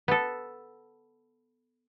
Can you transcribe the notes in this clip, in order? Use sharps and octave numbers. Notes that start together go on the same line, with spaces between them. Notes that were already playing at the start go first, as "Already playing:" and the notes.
B3 A4